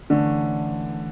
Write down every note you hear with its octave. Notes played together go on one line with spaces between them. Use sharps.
D3 E3 A3 C#4